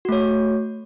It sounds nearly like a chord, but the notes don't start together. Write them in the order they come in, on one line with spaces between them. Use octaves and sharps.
F#4 A3 C#5